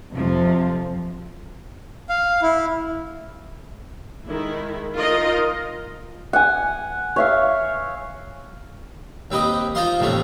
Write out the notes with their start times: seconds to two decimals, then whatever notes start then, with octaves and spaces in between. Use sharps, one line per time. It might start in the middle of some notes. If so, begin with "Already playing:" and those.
0.12 F2 C3 F3
2.09 F5
2.42 E4
4.28 D#3 G#3 E4
4.95 D#4 F4 A#4 D#5 F5
6.33 F#5 G#5
7.16 C#5 E5 F5
9.31 D#2 C4 G4 B4 D#5 D#6
9.75 F3 D#4 F4 D#5 F5 C6
9.99 D#2 A2 C3 E3 A3 C#4